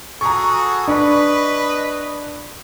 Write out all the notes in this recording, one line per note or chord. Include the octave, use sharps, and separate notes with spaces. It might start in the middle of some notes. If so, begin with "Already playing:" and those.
F#4 G#4 A4 A#5 C#6
D4 B4 D#5 B5 C#6